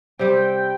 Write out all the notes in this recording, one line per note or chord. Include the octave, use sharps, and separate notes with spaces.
C3 G3 C4 G4 G5